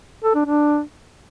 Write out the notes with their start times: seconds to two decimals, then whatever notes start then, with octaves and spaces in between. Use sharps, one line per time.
0.23 A4
0.35 D4
0.46 D4